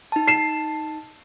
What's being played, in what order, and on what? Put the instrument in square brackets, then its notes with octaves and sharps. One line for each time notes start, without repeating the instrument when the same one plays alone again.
[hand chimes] D#4 A5
[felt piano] C7 E7